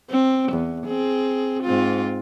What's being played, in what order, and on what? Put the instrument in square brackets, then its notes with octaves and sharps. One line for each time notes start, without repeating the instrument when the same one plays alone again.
[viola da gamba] C4
E2
C4 G#4
G#2 C4 F4